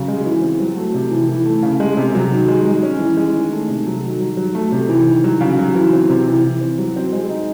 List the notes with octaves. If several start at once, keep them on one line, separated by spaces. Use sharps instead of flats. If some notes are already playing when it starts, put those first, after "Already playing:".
Already playing: C#3 F#3
G#3
E3
C4
F#3
A3
C3
E3
E3
A3
C#3
G#3
C3
F#3
D#3
G#3
G#3
C#4
E3
G#3
D#3
A3
C3
F#3
D#3
F#3
F#3
A3
C3
E3
D#3
F#3
C#3
F#3
E3
C4
C3
E3
E3
C4
F#3
C4
G#3
D#4